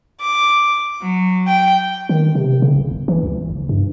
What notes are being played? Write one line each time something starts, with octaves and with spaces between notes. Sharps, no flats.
D6
F#3
G5
D#3
C3
C#3
D1
G1
E3
C#2
F#1
G2